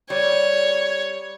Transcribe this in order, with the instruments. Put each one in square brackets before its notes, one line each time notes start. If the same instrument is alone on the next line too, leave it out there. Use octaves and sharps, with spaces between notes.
[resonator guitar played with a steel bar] G3 [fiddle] C#5